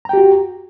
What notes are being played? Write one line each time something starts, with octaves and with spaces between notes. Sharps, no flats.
F#4 G4 G5 A#5